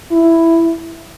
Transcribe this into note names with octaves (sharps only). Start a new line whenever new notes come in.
E4